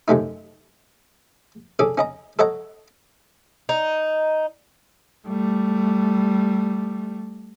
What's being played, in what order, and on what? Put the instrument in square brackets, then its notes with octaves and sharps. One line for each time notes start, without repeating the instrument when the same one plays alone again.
[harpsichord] F#2 C3 A3 D#4
C#4 D4 G#4 A4
C#4 D#5 A#5
A4 C#5 D#5 F#5 A#5
[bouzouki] D#4
[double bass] G3 A3